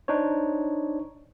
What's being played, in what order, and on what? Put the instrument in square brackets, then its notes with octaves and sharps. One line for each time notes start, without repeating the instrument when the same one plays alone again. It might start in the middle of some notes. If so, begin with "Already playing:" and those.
[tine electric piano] D4 D#4 C5 C#5